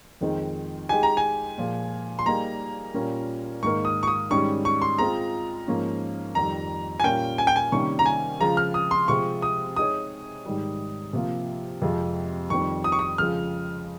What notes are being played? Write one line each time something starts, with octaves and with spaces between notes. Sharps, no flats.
F2 D#3 G#3 C4 D#4
G#3 D#4 G4 G#5
A#5
G#5
A#2 F3 G#3
C6
G3 A#3 D#4 G#4 A#5
A#2 G3 C#4 F4 A#4
G#2 D#3 A#3 D#4 A#4 C#6
D#6
C#6
D#6
G#2 D#3 G3 C#4 C#6
C#6
C6
G#3 C4 F4 A#5
G#2 F3 A#3 C#4
F2 D#3 G3 A#5
G#5
A#2 G3 C#4 F4 A#4 G5
G#5
G5
G#5
C3 D#3 G3 A#3 C#4 C#6
A#5
G#5
C#3 F3 G#3 A#5
F6
D#6
C6
C3 F3 G#3 C4 C#6
D#6
G#3 D#4 G#4 C#5 D#6
G#2 D#3 G3
C3 F3 A#3 F4
F2 C3 F3 G#3
F2 D#3 G3 C4 C#6
D#6
C#6
D#6
F2 C#3 F3 G#3 F6